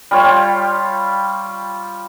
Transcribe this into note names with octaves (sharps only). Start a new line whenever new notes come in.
G3 F4 C#5 G5